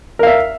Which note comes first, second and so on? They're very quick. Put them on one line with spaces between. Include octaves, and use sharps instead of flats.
A#4 F5 E5